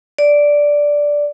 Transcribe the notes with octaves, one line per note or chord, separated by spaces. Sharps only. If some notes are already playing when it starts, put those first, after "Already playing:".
D5